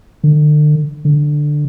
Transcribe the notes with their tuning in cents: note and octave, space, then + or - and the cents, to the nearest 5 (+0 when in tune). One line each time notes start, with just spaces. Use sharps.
D3 +35
D3 +10